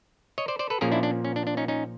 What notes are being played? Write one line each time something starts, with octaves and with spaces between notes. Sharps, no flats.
C#5 D#5
C5 D5
C5 D5
A4 B4
A#2 F3 A#3 C#4 G#4 A#4
D4 E4
D4
C#4
D4
D4
C#4 D#4
C#4 D#4